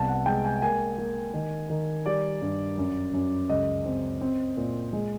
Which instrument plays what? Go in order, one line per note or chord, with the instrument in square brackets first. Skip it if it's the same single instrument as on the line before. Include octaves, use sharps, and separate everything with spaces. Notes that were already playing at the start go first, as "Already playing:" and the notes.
Already playing: [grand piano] C2 B3 A5
F#5
G#3 G5
G#5
A#3 G#5
A#3
D#3
D#3
G3 D5
G2
F#2
F#2
C#2 D#5
C4
C4
A#2
G#3